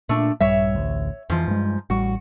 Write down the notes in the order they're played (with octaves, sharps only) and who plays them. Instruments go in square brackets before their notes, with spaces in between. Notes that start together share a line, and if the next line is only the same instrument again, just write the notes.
[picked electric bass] A#2 [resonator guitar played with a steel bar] A3 D4
[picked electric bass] A#1 G2 G3 [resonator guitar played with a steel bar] C#5 E5
[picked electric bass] A1 D2
[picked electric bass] F2 E3 [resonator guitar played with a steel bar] G#2 F3
[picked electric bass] G2 G#3
[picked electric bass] A1 G3 [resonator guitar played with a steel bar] F#4